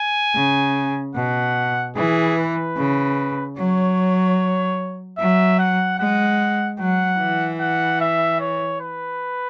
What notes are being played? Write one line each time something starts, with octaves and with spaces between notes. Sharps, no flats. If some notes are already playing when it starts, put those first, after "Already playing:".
Already playing: G#5
C#3
B2 F#5
E3 G#4
B4
C#3
F#3 C#5
F#3 E5
F#5
G#3 F#5
F#3 F#5
E3
F#5
E5
C#5
B4